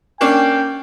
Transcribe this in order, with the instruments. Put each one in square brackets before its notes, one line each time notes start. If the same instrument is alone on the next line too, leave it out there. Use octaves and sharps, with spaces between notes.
[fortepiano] A#3 C#4 D4 [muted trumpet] G5